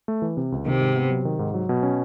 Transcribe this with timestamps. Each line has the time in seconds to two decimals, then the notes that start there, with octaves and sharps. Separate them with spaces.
0.08 A3
0.22 E3
0.37 C3
0.52 C#2
0.66 C3 D#3
0.81 G#2
0.96 B3
1.10 F#3
1.25 D#3
1.39 G#2
1.54 F#3
1.69 B2
1.83 C#4